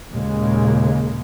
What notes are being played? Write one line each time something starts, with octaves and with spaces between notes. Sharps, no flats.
D#2 A#2 C#3 G#3 A#3